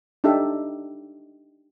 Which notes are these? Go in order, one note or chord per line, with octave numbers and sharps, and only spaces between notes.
D4 D#4 G4 A4 E5